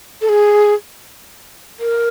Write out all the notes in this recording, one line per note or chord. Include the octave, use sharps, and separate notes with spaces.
A4
G#4
A#4